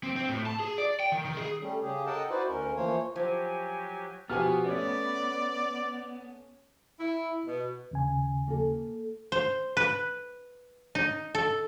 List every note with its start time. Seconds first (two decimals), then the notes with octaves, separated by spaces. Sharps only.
0.03 C4
0.16 C4
0.29 A2
0.46 A5
0.60 G#4
0.78 D5
1.00 G5
1.12 D#3
1.25 D#3
1.37 G#4
1.61 G3 A3 C#4
1.82 C#3 G4 G#4
2.06 A4 A#4 D#5 F#5 G5 A5
2.30 D#4 E4 F#4 B4 C5 D5
2.48 D2 C#4 A#4
2.76 E3 F3 A#3 C5 C#5
3.16 F3 F#3 G4 G#5
4.30 B2 F3 B3 G4 F#5 G#5 F6
4.65 A3 C#4 C#5 D5
7.00 E4
7.46 B2
7.91 D#2 C#3 G#5
8.48 A#3 A4
9.32 C5
9.77 B4
10.95 D#4
11.35 A4